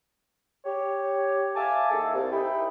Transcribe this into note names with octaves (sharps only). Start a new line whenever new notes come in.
G4 C#5
E5 F5 G#5 A5 D6
D#3 A#3 E4 G#4 A4
C2
D#4 E4 E5 G5 B5